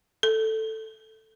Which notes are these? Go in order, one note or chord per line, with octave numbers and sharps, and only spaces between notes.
A4